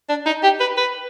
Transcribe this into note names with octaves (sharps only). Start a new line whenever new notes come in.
D4
D#4
G4
B4
B4